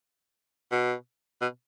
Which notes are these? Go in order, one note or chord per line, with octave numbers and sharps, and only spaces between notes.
B2
B2